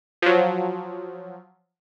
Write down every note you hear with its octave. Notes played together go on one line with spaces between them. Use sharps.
F3 F#3